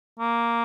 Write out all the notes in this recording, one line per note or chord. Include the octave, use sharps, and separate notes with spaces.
A#3